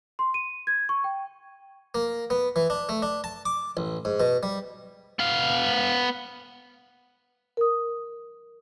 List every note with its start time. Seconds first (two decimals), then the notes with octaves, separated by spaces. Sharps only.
0.19 C6
0.34 D#7
0.67 G#6
0.89 C#6
1.04 G5
1.95 A#3
2.30 B3
2.56 E3
2.70 D4
2.89 A3
3.02 D4
3.24 A5
3.46 D6
3.77 A1
4.05 G#2
4.20 B2
4.43 G3
5.19 B3 F5
7.57 A#4 D#6